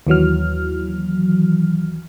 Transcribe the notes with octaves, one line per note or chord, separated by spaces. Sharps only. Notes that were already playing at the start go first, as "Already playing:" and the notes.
D#2 E3 F#3 F6